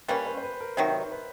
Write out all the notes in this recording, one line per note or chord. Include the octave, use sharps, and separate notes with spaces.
G3 A#3 C#4 B4
C5
C5
B4
A#4
C3 D#3 F#3 C5
B4